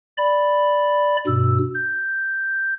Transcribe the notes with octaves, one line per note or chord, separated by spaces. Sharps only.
D5 B5
G2 B2 E6
G6